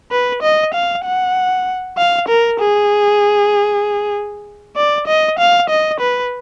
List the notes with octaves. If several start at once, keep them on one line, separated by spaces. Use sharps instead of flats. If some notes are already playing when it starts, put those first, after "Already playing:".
B4
D#5
F5
F#5
F5
A#4
G#4
D5
D#5
F5
D#5
B4